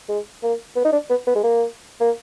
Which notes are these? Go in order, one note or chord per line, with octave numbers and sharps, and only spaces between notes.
G#3
A#3
B3
D#4
D4
B3
B3
G#3
A#3
A#3